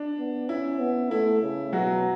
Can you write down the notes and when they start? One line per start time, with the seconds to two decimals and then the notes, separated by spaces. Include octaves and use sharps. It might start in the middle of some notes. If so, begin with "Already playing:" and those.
Already playing: D4
0.18 B3
0.49 C#4 E4
0.79 B3
1.11 A3 E4
1.42 C#3
1.73 B2 F#3 F#4